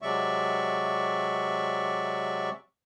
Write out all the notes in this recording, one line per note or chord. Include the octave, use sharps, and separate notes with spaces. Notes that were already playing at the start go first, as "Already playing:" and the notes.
C3 F#3 G#3 D5 E5 C#6